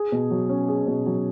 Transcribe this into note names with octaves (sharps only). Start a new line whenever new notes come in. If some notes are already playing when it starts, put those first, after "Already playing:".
Already playing: G#4
B2
F#3
C#4
G#4
B2
F#3